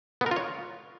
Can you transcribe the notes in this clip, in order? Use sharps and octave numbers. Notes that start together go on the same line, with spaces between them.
B3
A#4
F4
C#5